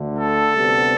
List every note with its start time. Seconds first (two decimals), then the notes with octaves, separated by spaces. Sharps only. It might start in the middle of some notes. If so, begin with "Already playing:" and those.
Already playing: D2 D3 A3
0.19 A4
0.54 D2 C3 G3 B3